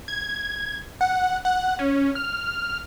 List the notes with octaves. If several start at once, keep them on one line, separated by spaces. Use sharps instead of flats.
G#6
F#5
F#5
C#4
F6